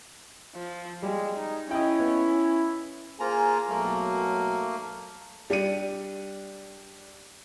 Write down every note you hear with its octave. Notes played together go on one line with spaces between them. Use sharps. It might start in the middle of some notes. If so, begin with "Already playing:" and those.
F3
G3 G#3
D#4
C#4 E4 D#5 G5
B3
A#3 F4 G#4 C5 G#5 A#5
B1 F#3 A3 A#3
G3 D4 C#7 D#7